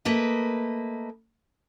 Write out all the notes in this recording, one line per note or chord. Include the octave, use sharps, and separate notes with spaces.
A3 A#3 B4 D#5